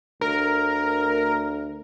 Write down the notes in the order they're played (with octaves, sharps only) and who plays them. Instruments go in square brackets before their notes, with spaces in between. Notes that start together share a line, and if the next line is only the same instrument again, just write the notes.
[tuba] D2 [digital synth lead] A#4